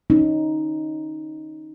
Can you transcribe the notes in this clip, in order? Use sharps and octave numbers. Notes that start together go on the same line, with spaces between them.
C#4 D#4